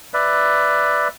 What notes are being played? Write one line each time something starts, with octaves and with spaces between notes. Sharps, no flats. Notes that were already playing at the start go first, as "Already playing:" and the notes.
B4 D5 E5